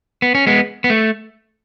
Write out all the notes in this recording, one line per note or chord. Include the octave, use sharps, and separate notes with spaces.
B3
C#4
G#3 B3
B3
A3